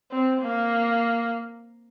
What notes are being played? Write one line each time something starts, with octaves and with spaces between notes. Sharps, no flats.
C4
A#3